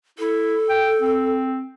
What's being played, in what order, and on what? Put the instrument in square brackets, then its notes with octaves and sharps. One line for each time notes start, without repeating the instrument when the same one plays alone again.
[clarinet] E4 [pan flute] A4
[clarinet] G5
C4